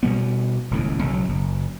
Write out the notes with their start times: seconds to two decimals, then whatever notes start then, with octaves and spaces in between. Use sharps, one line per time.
0.03 B2 G3 B3
0.71 D#1 C#2 A2
1.04 B1 C#3 F#3
1.29 F#1